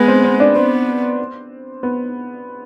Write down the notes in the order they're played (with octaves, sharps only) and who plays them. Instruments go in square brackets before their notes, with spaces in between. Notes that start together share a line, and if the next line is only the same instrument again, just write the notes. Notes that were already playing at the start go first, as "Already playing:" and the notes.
Already playing: [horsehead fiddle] G#3 [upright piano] B3
[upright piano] C4
C4
D4
[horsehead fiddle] B3 [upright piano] C4
[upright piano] B3